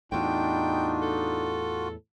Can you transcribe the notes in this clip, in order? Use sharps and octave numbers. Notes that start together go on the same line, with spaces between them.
E2 A2 D4 D#4 F4 F#4 G5
A4